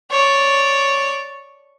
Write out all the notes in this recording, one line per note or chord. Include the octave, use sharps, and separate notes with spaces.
C#5 D5